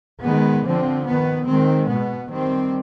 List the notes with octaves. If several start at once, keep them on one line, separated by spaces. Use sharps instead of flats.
D#3 G#3 B3
D3 F3 C4
D#3 B3
D#3 G#3 C4
B2 B3
D#3 G3 C4